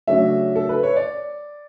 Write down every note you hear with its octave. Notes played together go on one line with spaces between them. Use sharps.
C#3 F#3 A3 D4 E5
A4
B4
C#5
D5